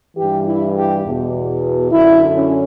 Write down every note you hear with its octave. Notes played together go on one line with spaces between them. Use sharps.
G2 E3 G4
E4
G4
E2 B2
F#2 D3 E4
C#4